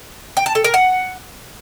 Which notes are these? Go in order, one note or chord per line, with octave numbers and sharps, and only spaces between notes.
G5
A5
A4
A#4
F#5